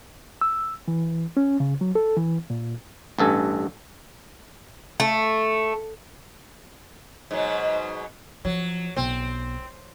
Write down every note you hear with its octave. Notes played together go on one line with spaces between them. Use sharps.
E6
E3
C#4
C#3
F#3
A4
E3
A#2
A1 G2 A4 G#5
A3
G#2 B2 F#3
F3 F#3
B1 C4